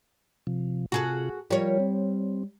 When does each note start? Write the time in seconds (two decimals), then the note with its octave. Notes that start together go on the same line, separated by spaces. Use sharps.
0.47 C3 F3
0.92 C3 F4 F#4 G#4 A4 F#5
1.50 F3 G3 F4 A#4 C#5
1.80 C4